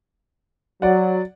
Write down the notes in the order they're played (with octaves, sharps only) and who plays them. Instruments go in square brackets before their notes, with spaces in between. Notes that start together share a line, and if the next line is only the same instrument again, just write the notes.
[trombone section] F#3 [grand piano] D5 F#5